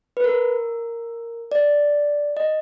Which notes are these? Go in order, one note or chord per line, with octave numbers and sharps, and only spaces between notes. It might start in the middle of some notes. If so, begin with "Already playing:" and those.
B4
A#4
D5
D#5